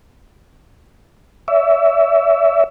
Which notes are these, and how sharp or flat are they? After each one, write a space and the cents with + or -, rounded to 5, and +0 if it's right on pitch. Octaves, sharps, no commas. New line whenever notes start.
C#5 +45 E5 +5